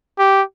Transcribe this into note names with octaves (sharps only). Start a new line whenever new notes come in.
G4